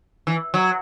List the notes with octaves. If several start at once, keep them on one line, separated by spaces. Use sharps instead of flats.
E3
F#3